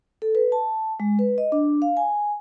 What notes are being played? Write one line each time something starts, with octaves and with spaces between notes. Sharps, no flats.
A4
B4
A5
G#3
B4
D#5
D4
F5
G#5